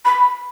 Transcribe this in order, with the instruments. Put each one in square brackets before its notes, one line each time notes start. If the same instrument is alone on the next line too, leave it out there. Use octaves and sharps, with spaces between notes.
[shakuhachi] B5